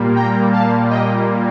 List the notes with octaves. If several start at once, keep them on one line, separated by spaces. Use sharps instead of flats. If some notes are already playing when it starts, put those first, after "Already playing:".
Already playing: A#2 G3 A#3
G5 A#5
F5 A5
D#5 G5